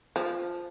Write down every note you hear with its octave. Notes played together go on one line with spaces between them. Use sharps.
F3